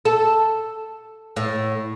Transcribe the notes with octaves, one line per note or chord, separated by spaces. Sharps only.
A4
A2